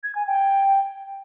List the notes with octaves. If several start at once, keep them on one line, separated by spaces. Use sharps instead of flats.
G#6
G#5
G5